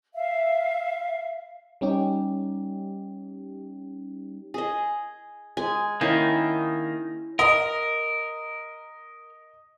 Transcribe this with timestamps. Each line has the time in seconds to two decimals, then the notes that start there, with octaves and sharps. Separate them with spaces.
0.14 E5 F5
1.81 G3 C#4 D#4 G4
4.54 G#4 D#5
5.57 G#3 G#5
6.01 D#3 A#3 C#4 E4
7.39 A#4 D#5